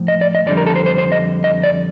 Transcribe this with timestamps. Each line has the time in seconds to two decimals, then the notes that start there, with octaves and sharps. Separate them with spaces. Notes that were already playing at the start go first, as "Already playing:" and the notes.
Already playing: A2 F3
0.08 D#5
0.21 D5
0.35 D#5
0.46 F2 D3 G3 D5
0.57 A#4
0.67 A4
0.76 C5
0.86 C5
0.98 C5
1.12 D#5
1.44 D#5
1.63 D5